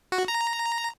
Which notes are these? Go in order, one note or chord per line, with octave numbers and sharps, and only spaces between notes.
F#4
A#5